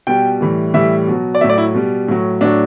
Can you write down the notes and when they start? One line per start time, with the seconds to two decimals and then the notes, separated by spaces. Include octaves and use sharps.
0.07 B2 G3 G5
0.41 A2 E3 G3
0.74 A2 E3 G3 E5
1.07 B2 F#3
1.35 D5
1.41 A2 F#3 E5
1.49 D5
1.58 E4
1.74 B2 G3
2.08 A2 F#3
2.41 A2 F#3 D4